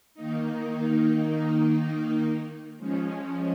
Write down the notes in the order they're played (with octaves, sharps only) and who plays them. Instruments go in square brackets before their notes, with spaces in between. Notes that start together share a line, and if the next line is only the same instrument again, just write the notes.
[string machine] D#3 A#3 D#4
F3 G#3 C#4